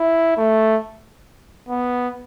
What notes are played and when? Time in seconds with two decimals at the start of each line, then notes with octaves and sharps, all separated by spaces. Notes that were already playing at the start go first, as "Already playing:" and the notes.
Already playing: E4
0.37 A3
1.69 B3